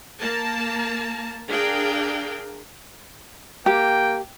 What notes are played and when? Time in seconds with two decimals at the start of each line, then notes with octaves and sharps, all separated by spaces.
0.22 A#3 A5 A#5
1.50 D4 G#4 A#4 F5 G5
3.66 A#3 G4 G5